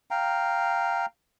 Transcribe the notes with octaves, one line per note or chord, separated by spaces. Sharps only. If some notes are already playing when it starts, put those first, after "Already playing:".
F5 G5 A#5